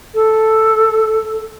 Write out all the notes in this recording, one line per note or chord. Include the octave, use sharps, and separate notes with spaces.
A4